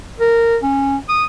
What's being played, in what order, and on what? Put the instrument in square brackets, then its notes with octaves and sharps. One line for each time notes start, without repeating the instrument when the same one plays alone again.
[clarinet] A#4
C#4
D#6